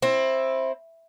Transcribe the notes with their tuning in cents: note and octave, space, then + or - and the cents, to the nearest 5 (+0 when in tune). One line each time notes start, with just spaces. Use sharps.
C4 +15 E4 +0